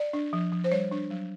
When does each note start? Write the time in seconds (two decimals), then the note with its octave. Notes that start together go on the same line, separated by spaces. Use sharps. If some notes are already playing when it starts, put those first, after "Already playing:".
Already playing: D5
0.13 D4
0.33 F3
0.52 F3
0.64 C5
0.71 G3 C#5
0.91 D4
1.11 F#3